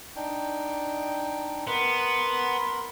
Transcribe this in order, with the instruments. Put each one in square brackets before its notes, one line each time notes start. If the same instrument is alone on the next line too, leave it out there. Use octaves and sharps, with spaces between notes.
[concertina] D4 D#4 G5
[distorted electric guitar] B3 [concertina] A#4 C6